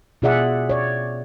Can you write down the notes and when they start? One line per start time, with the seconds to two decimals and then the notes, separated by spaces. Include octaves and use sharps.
0.22 B2 F4 G#4 D5 E5 F#5
0.69 C#5 D5